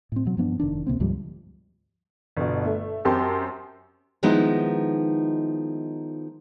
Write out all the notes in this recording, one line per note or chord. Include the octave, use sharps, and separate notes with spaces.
A2 C4
B2 F#3
G2 F3 B3 D4
F1 D#3 D4
C#2 C3 A#3 C4
D2 G#2 F3 G3
G1 B2
A3
F#2 C4 G4 A5 C6
D#3 F3 G#3 B3 D#4 E4